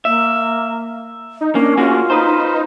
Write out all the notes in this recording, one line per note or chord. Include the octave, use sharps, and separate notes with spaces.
A#3 E5
D#4
A#3 C#4 D4
A#3 F4 F#4 G#4
D#4 B4 C5